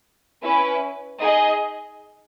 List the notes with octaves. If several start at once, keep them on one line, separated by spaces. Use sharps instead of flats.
C#4 E4 B4
D#4 G#4 D#5